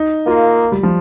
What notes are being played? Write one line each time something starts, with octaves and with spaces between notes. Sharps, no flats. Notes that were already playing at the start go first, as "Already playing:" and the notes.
Already playing: D#4
A#3 F4
G3
F3